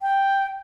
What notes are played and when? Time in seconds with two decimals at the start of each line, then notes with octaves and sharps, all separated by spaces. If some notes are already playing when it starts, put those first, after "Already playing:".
0.01 G5